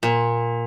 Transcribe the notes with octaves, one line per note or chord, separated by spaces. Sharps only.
A#2